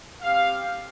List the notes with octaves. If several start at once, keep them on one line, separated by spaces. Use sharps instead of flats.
C4 G4 F5